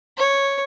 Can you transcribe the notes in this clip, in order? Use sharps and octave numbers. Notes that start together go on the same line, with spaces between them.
C#5